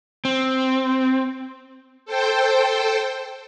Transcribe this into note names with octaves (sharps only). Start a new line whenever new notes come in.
C4
A4 C5 G5